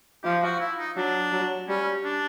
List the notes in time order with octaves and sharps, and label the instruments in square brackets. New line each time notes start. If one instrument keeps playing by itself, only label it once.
[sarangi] F3 [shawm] G4
[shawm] F#4
E4
D#4
[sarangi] F#3 [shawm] D4
[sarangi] F#3
[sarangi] G3 [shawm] C#4
[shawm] D4